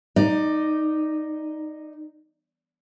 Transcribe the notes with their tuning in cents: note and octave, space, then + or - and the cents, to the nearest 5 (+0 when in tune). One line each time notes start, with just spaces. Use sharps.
D#4 +0 D5 +15